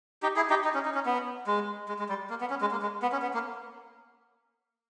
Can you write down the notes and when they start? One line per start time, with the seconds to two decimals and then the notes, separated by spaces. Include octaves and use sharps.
0.23 D#4 G4
0.36 E4 G#4
0.50 D#4 G4
0.64 D#4
0.74 C#4
0.85 D#4
0.95 C#4
1.06 B3
1.47 G#3
1.89 G#3
1.99 G#3
2.09 G3
2.30 A#3
2.41 B3
2.50 C#4
2.61 G#3
2.71 A#3
2.82 G#3
3.02 B3
3.12 C#4
3.22 B3
3.34 A#3